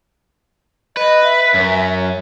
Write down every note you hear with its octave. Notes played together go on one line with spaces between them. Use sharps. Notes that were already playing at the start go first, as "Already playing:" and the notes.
B4 D#5
E5
F#2